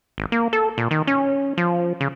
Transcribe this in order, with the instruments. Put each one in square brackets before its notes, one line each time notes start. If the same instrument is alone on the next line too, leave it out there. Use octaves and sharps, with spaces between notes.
[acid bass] G#1
A#3
A4
A#2
D#3
C#4
F3
C#3